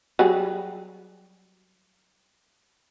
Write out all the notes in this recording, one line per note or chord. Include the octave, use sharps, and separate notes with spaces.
F#3 G3 G#4